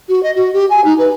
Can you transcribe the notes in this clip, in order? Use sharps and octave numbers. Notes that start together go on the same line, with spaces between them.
F#4
D#5
F#4
G4
G#5
D#4
B4